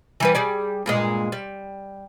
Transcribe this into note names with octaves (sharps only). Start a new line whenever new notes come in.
E3 G3 B4
G3 G#4 D5
G2 A#2 G#3
G3